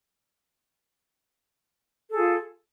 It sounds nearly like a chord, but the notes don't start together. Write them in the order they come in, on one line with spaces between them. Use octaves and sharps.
A4 G#4 F4